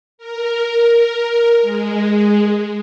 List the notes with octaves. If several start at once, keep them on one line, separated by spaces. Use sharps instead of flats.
A#4
G#3